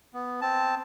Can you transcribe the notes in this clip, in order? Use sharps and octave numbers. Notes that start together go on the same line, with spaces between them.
B3
C4 A5